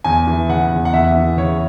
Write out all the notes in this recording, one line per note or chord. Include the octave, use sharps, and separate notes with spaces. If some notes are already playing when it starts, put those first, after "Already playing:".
E2 G#5
E3
C#3 F#5
E2
F#5
E2 E5
E3
C#3 C#5